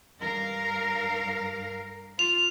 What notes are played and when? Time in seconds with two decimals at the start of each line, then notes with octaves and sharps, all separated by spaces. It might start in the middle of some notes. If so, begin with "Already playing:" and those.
0.19 G2 A#4 F5
2.19 F4 F7